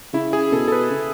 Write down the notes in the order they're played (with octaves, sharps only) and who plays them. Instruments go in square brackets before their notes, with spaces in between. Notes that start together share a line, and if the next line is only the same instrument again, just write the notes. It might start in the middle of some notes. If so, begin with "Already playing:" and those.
[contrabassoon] C#3 [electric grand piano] E4
[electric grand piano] G#4
[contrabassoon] B2 [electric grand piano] A4
[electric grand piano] A4
B4
[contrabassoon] C#3